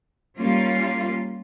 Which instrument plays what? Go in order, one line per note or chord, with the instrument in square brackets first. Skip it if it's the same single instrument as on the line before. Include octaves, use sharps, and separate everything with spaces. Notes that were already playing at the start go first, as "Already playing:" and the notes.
[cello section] G3 A#3 C#4 F4